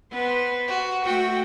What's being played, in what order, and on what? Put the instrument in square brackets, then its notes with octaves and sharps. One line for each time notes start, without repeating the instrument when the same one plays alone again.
[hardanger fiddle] B3 [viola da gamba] B4 C5
[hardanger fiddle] F#4
[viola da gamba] A3 F#4 [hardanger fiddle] G5